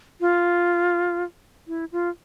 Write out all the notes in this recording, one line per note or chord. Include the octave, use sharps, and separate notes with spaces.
F4
E4
F4